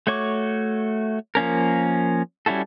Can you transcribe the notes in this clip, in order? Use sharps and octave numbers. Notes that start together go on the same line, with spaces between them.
A3 F#4 C#5 C#6 D6
F3 A#3 C#4 A#4
G3 C#4 E4 F#4 A4